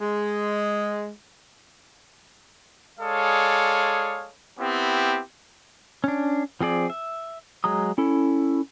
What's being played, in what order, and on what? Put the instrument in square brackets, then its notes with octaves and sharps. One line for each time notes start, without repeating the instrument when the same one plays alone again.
[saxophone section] G#3
[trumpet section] G#3 G#4 A4 C#5 D5 F5
B3 C4 E4 G4
[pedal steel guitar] C#4 D4
F3 C4 G#4 D5
E5
F#3 G#3 A#5 D#6
C#4 E4 A4